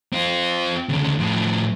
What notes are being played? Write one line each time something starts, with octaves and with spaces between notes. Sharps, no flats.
C4 F4
D2 C#3
A2 F3